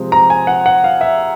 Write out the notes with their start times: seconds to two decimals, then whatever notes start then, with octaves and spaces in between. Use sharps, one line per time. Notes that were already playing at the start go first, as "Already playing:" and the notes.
Already playing: C3 F3 G#3 C4
0.12 A#5
0.30 G#5
0.47 F#5
0.66 F#5
0.84 F5
1.01 E5